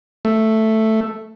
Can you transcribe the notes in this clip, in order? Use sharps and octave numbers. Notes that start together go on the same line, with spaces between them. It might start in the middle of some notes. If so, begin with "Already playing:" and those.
A3